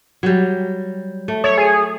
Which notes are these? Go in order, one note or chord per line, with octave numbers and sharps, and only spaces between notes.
F#3 G3
A3
C#5 E5
G#4